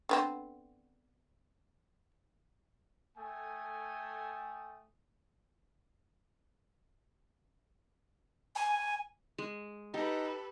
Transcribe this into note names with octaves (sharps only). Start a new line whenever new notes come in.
D3 B3 C4
A3 A4 G5 G#5 D#6
G#5
G#3
D#4 G4 A4 B4